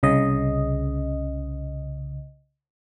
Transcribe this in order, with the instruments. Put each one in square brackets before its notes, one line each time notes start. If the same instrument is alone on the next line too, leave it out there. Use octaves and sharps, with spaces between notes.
[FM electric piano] C2 C#3 D#5